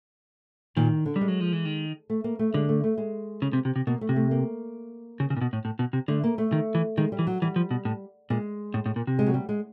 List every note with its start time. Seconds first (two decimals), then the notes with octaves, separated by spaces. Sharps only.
0.76 A#2 D#3
1.06 D3
1.16 G3
1.21 G#3
1.28 F#3
1.40 F3
1.53 E3
1.65 D#3
2.10 A3
2.24 A#3
2.39 A3
2.54 D3 G#3
2.69 A3
2.84 A3
2.98 G#3
3.42 C#3
3.53 C3
3.65 C3
3.76 C3
3.87 B2 A#3
4.01 A3
4.09 C3
4.16 A3
4.31 A#3
5.20 C#3
5.30 C#3
5.37 A#2
5.41 B2
5.53 A2
5.65 A2
5.79 B2
5.93 C3
6.08 D3 A3
6.24 A#3
6.38 A3
6.53 D#3
6.75 E3
6.97 D#3 G#3
7.12 G3
7.19 E3
7.27 F#3
7.42 E3 G3
7.56 F3
7.71 B2
7.85 A2
8.30 A#2 G#3
8.74 A2
8.86 A2
8.96 A#2
9.07 C3
9.19 G#3
9.26 F#3
9.34 G3
9.49 G#3